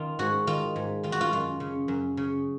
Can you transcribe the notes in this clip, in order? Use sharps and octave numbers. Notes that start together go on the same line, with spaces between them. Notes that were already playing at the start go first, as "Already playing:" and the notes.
Already playing: D#3 D#4 F4
G#2 F#4
D#3 F4
G#2
D#3 F4
F#4
F4
F#2 F4
C#3
F#2
C#3